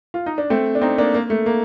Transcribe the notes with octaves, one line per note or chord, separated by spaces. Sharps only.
F4
D#4
D4
A3 C4
D4
C4 D#4
A#3 D4
A#3
A3
A#3